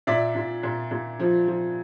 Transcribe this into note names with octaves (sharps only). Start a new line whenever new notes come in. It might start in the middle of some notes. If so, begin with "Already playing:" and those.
A#2 D5 E5
A#2
A#2
A#2
F3
F3